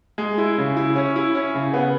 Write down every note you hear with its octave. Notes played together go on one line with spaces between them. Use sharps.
G#3
E4
C#3
E4
C#4
E4
C#4
C#3
B3